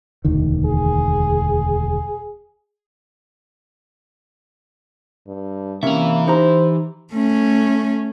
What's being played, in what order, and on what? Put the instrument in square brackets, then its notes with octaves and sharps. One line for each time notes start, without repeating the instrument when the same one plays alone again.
[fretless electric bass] E1 D2 D#3
[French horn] G#4
[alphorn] G2
[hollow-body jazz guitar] C3 C#4 [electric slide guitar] E3 E5 [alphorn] A#3
[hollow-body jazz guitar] D#4 G4 A#5 [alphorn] C5
[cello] A3 C#4